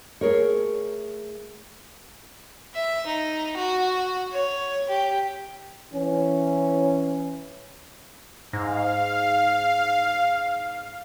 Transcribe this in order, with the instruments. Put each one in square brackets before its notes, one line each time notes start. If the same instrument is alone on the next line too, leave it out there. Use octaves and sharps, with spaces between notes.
[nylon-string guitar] A3 G#4 A#4 C#5
[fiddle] E5
D#4
F#4
C#5
G4
[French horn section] E3 C#4
[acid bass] G#2 [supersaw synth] F5